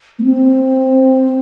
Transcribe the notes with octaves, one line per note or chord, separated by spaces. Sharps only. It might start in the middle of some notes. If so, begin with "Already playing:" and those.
A#3
C4